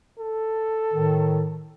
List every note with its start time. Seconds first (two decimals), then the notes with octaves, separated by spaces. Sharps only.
0.19 A4
0.93 A2 D#3